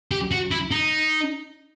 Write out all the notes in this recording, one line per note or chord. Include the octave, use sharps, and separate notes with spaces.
G4
F#4
E4
D#4